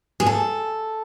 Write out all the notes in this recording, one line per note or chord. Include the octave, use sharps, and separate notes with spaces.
G#4
A4